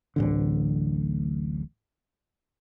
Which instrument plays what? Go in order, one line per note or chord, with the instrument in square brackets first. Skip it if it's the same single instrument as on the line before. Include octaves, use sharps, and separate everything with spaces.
[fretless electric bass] D1 A1 D3